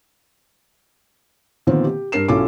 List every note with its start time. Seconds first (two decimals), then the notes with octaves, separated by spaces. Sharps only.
1.67 A#2 D3 D#3 F3 B3 C4
1.84 G4
2.12 G2 D4 A#4 C7 E7
2.28 B1 C#4 E4 F4 A4 D6